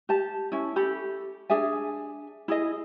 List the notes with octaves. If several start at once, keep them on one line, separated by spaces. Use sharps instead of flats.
G4 A5
C#4 E4
G4 A4 B5
D4 G#4 E5 G#5
E4 G#4 D#5